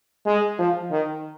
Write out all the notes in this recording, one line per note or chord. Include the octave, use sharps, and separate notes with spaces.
G#3
F3
D#3